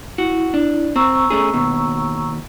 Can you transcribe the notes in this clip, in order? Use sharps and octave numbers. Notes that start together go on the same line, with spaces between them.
E4 F#4
D4
C4 A#5 C#6 E6
A3 C#4 G#4
D#2 B2